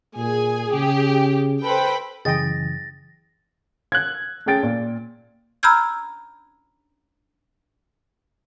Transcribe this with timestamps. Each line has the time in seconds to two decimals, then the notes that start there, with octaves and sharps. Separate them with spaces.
0.17 A#2 G#4 G#5
0.73 C#3 G4
1.62 A4 B4 C5 G5 B5
2.25 F#2 C#3 E3 G#4 D#5 G5 A6 A#6
3.92 F#6 G#6
4.46 A3 C#4 G#4 G5 A6 D7
4.63 A#2
5.63 A#5 B5 E6 F6 G6 G#6